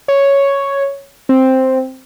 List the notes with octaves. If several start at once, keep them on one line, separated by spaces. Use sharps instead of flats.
C#5
C4